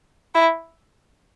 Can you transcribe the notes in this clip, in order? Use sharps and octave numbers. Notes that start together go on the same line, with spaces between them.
E4